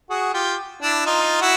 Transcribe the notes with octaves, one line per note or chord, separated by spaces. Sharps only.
F#4 G#4
F4 G4
D4 E4
D#4 F4
E4 F#4